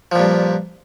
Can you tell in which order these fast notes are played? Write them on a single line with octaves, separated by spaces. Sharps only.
F3 A#2 G2